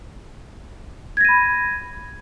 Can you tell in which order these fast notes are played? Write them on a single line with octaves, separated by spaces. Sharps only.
G#6 A#6 D#7 B5